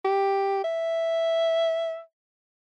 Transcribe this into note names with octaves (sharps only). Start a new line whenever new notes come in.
G4
E5